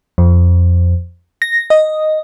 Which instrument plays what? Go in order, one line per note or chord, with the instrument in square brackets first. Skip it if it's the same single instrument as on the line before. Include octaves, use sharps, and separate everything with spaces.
[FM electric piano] F2
A#6
D#5